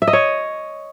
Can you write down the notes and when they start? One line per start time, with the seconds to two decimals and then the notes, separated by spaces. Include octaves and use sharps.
0.02 E5
0.08 D#5
0.13 C#5